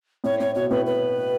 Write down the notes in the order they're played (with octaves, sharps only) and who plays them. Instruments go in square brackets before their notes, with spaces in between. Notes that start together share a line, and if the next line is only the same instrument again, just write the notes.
[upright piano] A2 [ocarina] C#5
[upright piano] A2 [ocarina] C#5
[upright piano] B2 [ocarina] C#5
[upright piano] A2 [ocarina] B4
[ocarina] B4